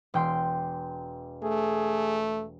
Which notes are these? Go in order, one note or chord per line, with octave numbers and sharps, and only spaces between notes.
E1 G5 C6
A3 G#4